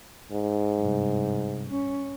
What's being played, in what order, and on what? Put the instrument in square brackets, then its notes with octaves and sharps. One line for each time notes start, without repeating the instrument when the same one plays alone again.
[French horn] G#2
[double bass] G2 C3
C#4